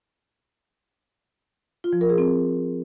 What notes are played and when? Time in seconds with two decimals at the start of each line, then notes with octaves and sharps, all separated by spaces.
1.84 F4
1.93 F3
2.01 A#4
2.10 G#4
2.18 C4